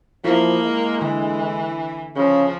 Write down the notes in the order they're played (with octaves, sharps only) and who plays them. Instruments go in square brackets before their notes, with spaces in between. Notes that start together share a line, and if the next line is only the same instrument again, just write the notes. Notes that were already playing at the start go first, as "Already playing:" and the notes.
[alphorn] F3 [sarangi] A#3 [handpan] E4
[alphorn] G#3
[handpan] D3 [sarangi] E3
[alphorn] C#3 [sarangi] F3